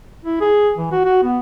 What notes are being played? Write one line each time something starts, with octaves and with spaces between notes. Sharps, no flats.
E4
G#4
E3
F#4
F#4
B3